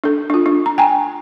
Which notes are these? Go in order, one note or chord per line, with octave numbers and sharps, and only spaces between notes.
D4 A4
D4 F4
D4
A#5
G5 G#5 A#5